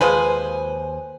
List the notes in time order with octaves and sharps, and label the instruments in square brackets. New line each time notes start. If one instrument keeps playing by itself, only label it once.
[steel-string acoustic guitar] D#2 C5 G#5 [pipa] F3 G#3 B4